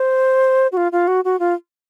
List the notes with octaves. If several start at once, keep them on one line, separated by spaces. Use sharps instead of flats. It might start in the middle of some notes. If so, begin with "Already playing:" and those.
Already playing: C5
F#4
F4
F4
F#4
F#4
F4